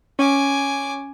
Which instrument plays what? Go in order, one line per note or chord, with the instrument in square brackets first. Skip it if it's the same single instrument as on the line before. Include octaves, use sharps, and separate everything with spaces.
[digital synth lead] C#4 [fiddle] G#5 D6